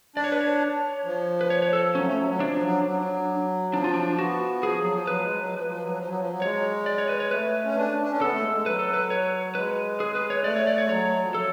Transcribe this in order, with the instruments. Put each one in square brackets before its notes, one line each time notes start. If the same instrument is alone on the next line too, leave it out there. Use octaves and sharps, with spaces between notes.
[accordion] D4 [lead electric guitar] D5
[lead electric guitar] C#5
B4
C#5
[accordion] F3
[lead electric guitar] B4
C#5
C#5
A4
[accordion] F#3 [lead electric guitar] C#4
[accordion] A3
F#3
F#3
[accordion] F3 [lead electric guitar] D4
[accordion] F#3
F#3
[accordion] F3 [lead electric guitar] D4
[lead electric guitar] F4
D4
[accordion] B3 [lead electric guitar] F#4
[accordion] F3 [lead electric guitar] G#4
[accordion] F#3
F3
[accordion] F#3 [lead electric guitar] B4
[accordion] G#3
F#3
F3
F3
F#3
F3
F#3
F3
F#3
[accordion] G#3 [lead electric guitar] C#5
[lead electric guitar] D5
C#5
B4
C#5
[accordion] A3 [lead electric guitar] B4
[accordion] C#4
D4
D4
C#4
[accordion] B3 [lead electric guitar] A4
[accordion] A3
G#3
G#3
[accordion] F#3 [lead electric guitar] B4
[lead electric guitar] A4
B4
C#5
[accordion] G#3 [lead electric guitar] B4
[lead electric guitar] G#4
B4
C#5
[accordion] A3 [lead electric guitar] D5
[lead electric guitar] C#5
D5
C#5
[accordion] G#3
[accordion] F#3 [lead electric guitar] C#5
[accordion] F3
[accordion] F#3 [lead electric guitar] A4